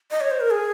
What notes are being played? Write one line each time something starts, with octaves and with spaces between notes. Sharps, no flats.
D#5
C#5
C5
A#4
G#4